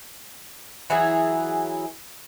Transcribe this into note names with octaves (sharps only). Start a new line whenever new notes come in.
E3 F#3 E4 G#4